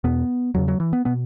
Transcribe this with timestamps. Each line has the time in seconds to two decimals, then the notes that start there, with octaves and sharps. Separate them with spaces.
0.04 E2 B2 B3
0.55 E2 C#3 F#3
0.68 F#3
0.80 E3
0.93 B3
1.05 B2 B3